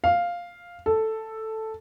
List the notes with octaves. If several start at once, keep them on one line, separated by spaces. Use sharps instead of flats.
F5
A4